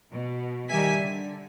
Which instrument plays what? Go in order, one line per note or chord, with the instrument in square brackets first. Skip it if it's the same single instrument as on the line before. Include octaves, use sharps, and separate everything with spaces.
[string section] B2
D#3 G3 G4 E5 G#5 B6
D3